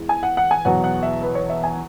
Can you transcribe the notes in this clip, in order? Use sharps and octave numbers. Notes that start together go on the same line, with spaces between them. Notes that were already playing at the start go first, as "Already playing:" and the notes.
Already playing: E2 E3 G#3
G#5
F#5
F#5
G#5
E2 B2 F#3 F#5
F#5
E5
B4
C#5
E5
G#5